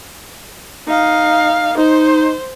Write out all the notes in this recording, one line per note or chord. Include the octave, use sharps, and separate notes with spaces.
D#4 F5
D#4 C5